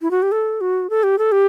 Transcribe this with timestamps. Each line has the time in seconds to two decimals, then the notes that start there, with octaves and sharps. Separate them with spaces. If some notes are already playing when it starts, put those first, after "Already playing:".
0.02 E4
0.11 F#4
0.22 G4
0.32 A4
0.61 F#4
0.90 A4
1.03 G4
1.18 A4
1.32 G4